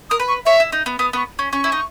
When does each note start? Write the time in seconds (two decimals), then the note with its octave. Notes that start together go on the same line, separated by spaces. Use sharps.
0.10 A#4 D#6
0.20 B4
0.28 C#6
0.46 C#5 E5
0.60 E4
0.72 D#4
0.86 B3
0.99 B3 D#6
1.13 B3 C#6
1.39 C#4
1.53 C#4 C#6
1.64 E4
1.72 D#4